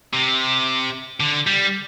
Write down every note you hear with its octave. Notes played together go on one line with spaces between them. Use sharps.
C3
D3
G3